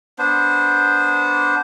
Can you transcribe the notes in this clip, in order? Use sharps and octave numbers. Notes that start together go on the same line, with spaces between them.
B3 D4 C5